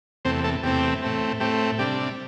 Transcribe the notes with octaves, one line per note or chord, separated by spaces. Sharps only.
E2 C3 A3 C4 C5
A3 A4
E2 C3 A3 C4 G4
A2 A3 C4
A2 A3 C4 G4
C3 G3 D4 G4